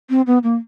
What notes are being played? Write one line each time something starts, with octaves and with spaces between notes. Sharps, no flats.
C4
B3
A#3